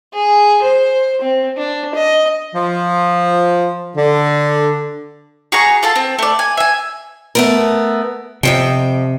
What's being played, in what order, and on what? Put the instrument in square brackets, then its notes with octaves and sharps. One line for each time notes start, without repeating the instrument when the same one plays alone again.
[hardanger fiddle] G#4
C5
C4
D4
D#5
[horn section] F3
D3
[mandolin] F#4 G#4 A#5 C#6
F4 A4 A5
C4
A3 D5
G#5
E5 G#5
[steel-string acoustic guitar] A3 B3 A#4
[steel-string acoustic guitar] F2 D#3 G5 [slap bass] C3